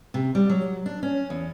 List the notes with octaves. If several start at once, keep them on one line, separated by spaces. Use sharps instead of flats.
C3
G3
F#3
D4
C#4
E2